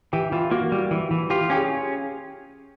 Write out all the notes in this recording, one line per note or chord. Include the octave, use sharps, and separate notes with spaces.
E3 G4
E3 F4
A#3 F#4
G3
E3
E3
F4 G4
C#4 G4
G#4